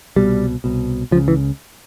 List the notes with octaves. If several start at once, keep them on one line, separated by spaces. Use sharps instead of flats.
C2 B2 G3
C2 B2
C#2 C#3 F3
E3